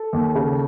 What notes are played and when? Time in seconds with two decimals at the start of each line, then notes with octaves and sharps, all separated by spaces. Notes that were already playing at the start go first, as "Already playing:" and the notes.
Already playing: A4
0.13 D#2
0.35 C#3